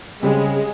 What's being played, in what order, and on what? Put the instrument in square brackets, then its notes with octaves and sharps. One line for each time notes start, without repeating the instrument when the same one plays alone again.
[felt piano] C#3 G3 C4 [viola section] G#3